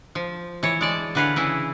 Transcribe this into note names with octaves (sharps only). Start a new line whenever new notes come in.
F3
E3 C#5
G#3 D5 A5
D3 E3 B4 C#5 F5
C#3 E3 E4